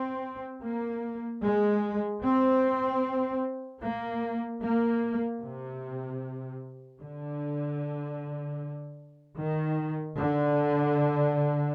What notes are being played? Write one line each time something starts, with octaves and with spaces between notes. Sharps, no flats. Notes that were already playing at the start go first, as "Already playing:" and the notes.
Already playing: C4
A#3
G#3
C4
A#3
A#3
C3
D3
D#3
D3